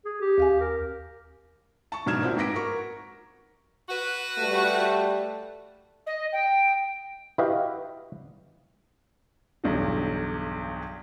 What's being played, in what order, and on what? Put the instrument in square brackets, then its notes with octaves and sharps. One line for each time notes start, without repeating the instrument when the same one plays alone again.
[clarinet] G#4
G4
[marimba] D#2 F5 G#5
[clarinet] A#4
[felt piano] A5 C#6
G#2 B2 D4 F6 G#6 E7
A#2 C4 E4 F#4
G#2 B4 D6 A#6 B6 D7
F#4 A#4 C#6
[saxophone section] F#4 B4
[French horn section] G3 A3
[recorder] D#5
G5
[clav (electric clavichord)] E4 F#4 G4 B4 D#5 F5
[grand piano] B1 E2 G2 B2 D3 F#3